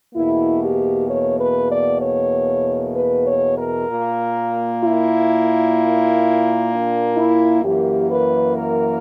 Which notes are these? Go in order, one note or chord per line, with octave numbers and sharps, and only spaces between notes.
E2 B2 A#3 E4
G4
C#5
B4
D5
C#5
B4
C#5
A#4
A#2 A#3
E4
D4
E4
F#2 E3 A#3 G4
B4
A#4